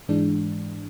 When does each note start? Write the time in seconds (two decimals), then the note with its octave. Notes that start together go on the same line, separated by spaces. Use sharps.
0.09 G#2 E3 G#3 D4